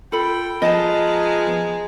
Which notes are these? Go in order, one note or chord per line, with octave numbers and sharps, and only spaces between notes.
F4 A4 G5 B5
F3 G#3 B3 D#5 A5 A#5